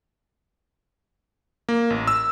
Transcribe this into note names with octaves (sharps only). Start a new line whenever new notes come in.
A#3
A1
E6